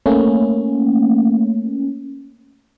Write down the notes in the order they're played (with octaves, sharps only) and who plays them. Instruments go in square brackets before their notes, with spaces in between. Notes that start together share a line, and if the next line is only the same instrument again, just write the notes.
[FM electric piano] A3 A#3 C#4